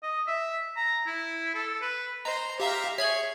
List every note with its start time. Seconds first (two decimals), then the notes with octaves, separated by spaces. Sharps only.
0.03 D#5
0.27 E5
0.76 A#5
1.07 E4
1.54 A4
1.82 B4
2.25 C5 D#5 A#5
2.60 G4 E5 F5 A#5
2.98 G#4 C#5 E5 G#6 F#7